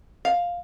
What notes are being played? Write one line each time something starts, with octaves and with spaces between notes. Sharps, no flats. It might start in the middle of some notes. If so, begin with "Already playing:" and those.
F5